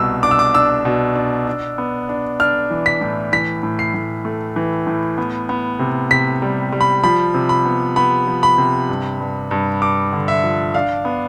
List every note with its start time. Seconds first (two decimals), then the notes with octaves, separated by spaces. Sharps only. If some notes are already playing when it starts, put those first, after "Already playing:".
Already playing: C2 B2 E6
0.23 D4 D6
0.31 E6
0.39 D6
0.54 D4 E6
0.85 B2
1.15 D4
1.47 D4
1.78 B3
2.09 D4
2.40 D4 F6
2.70 E3
2.86 B6
3.01 A2
3.32 E3 B6
3.63 A2
3.79 C7
3.94 A2
4.25 A3
4.56 E3
4.87 A2
5.18 B3
5.49 B3
5.79 C3
6.11 C3 B6
6.42 G3
6.72 G3
6.81 B5
7.03 F3 B5
7.34 C3
7.49 B5
7.65 B3
7.96 B3 B5
8.27 F3
8.43 B5
8.58 C3
8.89 G2
9.20 G2
9.51 G2
9.82 G2 D6
10.13 D3
10.28 E5
10.43 F3
10.74 D4 F5
11.05 B3